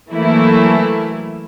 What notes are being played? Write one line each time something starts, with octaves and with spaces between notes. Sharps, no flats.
E3 F#3 A3 A#3 E4